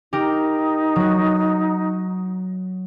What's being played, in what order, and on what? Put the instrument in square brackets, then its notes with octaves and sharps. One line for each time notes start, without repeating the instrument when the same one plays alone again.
[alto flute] D#4 [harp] G4 A#4 G5
[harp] F#3 F#4